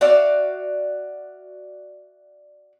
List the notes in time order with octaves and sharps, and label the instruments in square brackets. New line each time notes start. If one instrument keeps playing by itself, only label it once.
[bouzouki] F#4 D5 E5 F5